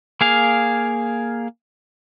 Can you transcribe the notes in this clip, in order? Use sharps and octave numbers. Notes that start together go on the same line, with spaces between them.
A#3 G#4 F5